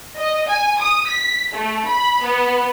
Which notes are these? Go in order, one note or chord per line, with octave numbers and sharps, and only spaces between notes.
D#5
G#5
D#6
B6
A3
B5
B3